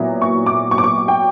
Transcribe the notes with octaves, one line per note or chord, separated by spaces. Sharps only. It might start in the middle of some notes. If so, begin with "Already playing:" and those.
Already playing: A#2 F#3 B3 E4
C#6
D6
C#6
D6
C#6
G5